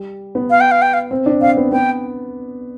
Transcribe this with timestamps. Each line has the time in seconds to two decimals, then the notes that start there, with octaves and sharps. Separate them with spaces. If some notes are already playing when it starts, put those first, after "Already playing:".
Already playing: G3
0.35 B3
0.50 F5
0.61 G5
0.71 F5
0.82 G5
0.94 F5
1.11 C4
1.26 D4
1.41 C4 F5
1.57 B3
1.72 B3 G5